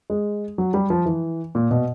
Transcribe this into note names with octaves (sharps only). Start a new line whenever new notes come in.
G#3
F#3
G3
F3
E3
A#2
B2